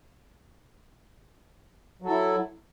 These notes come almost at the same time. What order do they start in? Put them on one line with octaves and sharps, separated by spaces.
F#3 A4 E4